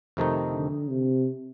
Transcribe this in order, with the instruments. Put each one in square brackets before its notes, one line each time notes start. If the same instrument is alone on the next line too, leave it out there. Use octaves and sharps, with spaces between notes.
[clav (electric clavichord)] F2 C3 D#3 A3 D#4
[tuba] D3
C3